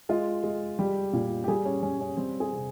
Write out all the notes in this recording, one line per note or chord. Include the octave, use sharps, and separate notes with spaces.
G#3 F4
G#3
G3 G4
A#2
G4
G3 G#4
C#4
G3 C#4
C#4
G3 C4
G#4
C3